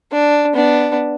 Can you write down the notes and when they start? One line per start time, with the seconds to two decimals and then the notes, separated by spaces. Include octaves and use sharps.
0.11 D4
0.54 B3 D4